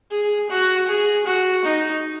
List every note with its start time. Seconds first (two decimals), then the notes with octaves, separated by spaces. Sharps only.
0.11 G#4
0.50 F#4
0.88 G#4
1.26 F#4
1.65 D#4